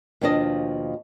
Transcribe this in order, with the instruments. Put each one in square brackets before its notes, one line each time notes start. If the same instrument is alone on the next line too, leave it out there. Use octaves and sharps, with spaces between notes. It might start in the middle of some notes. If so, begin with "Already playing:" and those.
[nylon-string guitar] D#2 B2 F3 D4 D5 D#5